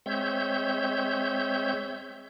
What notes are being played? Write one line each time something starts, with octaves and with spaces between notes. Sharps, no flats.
G#3 C4 C#5 E5 G6